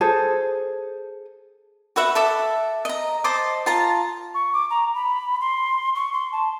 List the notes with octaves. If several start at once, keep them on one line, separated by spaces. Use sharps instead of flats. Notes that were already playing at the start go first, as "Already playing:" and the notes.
G#4 A4 C5
F#4 B4 E5 F#5
A4 E5 D6
D#5 A#5
C5 D#5 A5 D6
F4 A5 A#5
C#6
D6
A#5
B5
C6
C#6
C6
A5